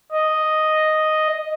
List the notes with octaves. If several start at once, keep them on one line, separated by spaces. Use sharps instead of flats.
D#5